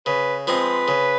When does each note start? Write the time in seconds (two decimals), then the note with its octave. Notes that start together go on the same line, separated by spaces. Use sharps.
0.06 C#3 B4
0.47 F3 G#3 C4 B4
0.88 C#3